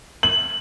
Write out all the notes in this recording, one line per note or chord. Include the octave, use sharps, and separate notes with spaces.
F#7